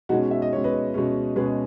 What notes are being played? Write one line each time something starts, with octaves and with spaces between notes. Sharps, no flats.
B2 G#3 C#4 D#4 F#4
E5
D#5
B2 G#3 C#4 C#5
B4 D#5
B2 G#3 C#4
B2 G#3 C#4 G#4 B4